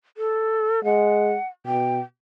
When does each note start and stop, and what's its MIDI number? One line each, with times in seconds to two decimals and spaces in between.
0.17 0.83 69
0.84 1.35 56
0.84 1.47 78
1.66 1.99 47
1.66 2.01 79